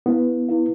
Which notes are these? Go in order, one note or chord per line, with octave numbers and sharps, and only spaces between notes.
B3 E4 B4 F5
E4 B4 F5